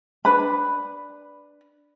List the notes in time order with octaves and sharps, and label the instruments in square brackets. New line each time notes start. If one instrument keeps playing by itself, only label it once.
[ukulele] D4 B4 B5